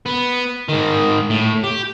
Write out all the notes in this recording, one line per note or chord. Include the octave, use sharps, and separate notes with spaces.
B3
G#2 D#3
A2
G4